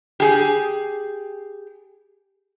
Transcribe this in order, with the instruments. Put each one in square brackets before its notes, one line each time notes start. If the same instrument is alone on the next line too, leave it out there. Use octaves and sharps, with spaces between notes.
[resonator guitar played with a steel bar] G4 G#4